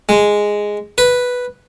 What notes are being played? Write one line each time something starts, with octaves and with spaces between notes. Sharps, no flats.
G#3
B4